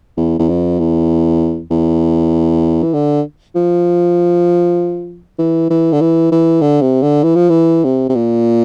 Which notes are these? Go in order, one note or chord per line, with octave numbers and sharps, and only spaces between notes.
E2
E2
F2
E2
E2
E3
D3
F3
E3
E3
D3
E3
E3
D3
C3
D3
E3
F3
E3
C3
C3
A#2